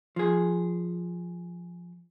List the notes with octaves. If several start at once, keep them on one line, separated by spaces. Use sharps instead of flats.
F3 G#4